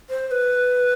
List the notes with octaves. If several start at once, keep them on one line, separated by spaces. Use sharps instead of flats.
C5
C5
B4